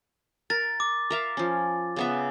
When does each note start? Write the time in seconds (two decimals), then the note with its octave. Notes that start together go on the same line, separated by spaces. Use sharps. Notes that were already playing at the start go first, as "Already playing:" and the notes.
0.50 A#4 A6
0.80 D6
1.10 A#4 E5 F5
1.37 F3 C#4
1.96 C#3 B3 E5